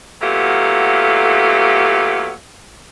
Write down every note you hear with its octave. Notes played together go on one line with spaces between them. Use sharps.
A#2 F#3 A3 B3 G4 F5